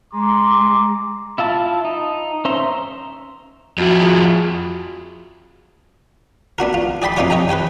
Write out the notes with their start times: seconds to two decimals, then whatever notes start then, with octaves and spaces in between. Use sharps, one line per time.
0.14 G#3 A#5 C6 D6
1.38 E4 F4 E5 A5
1.85 D#4
2.45 C#4 C5 E5 A#5 C6
3.78 F2 E4 F#4 D#5
4.01 F4 F#4 G#4
6.58 B3 D4 F#4 A#4
6.74 F4
7.02 G#4 D5 G5 B5 C6
7.17 F2 C4 D#4 F4 C#5 D6
7.30 C#5 D#5 G5 G#5 A#5
7.49 B4 C5 G5 G#5